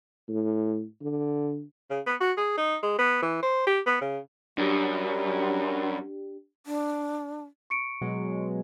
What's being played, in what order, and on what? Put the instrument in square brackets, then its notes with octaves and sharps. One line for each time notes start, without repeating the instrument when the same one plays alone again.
[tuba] A2
D3
[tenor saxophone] C#3
B3
F#4
G#4
D#4
G#3
B3
E3
C5
G4
B3
C#3
[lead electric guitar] F#2 [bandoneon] F#3 G3 [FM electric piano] D4 G4
[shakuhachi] D4
[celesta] C#6 C#7 D7
[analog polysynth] B2 F#3 G#3